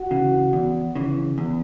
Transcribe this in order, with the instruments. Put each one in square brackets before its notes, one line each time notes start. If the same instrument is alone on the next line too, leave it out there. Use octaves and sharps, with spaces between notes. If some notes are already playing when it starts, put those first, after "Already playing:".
Already playing: [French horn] F#4
[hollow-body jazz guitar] C#3 E3
E2
C#3 E3
E2